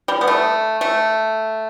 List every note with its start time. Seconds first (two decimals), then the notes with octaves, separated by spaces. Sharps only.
0.08 G3
0.21 B3
0.27 A3
0.81 A3